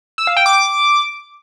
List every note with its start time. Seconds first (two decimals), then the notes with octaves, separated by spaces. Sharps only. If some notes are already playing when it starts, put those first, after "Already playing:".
0.18 E6
0.27 F5
0.37 G5
0.46 D6